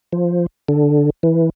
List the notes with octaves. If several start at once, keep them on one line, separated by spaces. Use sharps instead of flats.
F3
D3
E3